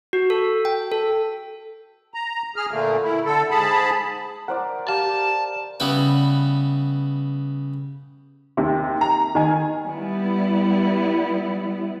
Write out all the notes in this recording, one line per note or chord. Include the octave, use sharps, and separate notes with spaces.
F#4
A4
G5
A4
A#5
G#4 F6
A#2 D3 A3 A#3
E4
D3 A4
G#2 G#4 A5 B5
A#4 C5 D5 F#5
G4 F5 A5
C#3 G3 B3 E4 B4
D#2 C3
A#5
D#3 G#5
G3 B3 E4